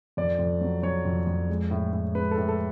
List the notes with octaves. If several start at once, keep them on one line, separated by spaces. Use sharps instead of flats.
F2 D5
F2
F#3
F#3 C#5
F2
F2
G#3
A2
A2
G#3 B4
A4
A2
A4